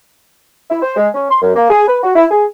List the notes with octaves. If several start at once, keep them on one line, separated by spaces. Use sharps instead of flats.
E4
C5
G#3
C#4
C6
F#2
A#3
G#4
B4
F#4
E4
G#4